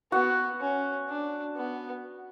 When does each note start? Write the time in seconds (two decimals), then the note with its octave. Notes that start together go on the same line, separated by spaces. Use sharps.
0.12 B3 F#4
0.60 C#4
1.08 D4
1.56 B3